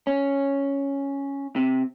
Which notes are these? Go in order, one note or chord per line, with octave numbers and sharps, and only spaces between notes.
C#4
C3